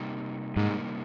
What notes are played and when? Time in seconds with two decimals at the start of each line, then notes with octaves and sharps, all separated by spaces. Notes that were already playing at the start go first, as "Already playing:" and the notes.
Already playing: C3 G3 A#3 D#4
0.56 G#2 C3 G3 A#3 D#4